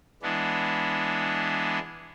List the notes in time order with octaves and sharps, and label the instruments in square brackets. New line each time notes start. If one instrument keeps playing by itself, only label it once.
[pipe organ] E3 G#3 B3 D4